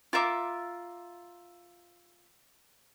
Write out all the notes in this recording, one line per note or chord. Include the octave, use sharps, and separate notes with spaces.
F4 A#4 E5 D6